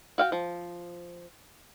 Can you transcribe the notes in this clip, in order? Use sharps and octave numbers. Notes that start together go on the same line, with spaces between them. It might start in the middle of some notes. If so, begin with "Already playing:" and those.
F#4 F5 G5
F3